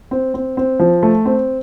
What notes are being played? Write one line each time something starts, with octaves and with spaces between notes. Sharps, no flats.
C4
C4
C4
F3
A3
C4